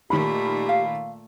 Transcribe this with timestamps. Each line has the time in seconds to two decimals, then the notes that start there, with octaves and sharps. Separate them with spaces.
0.10 A#2 D#3 A3 G4 B5
0.69 F5